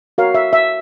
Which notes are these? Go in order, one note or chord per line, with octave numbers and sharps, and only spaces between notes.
F#4 A#4 C#5 F5
E5
E5